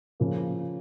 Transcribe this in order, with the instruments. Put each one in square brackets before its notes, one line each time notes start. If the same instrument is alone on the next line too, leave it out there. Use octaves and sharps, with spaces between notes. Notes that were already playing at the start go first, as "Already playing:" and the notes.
[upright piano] C#3 F3 A#3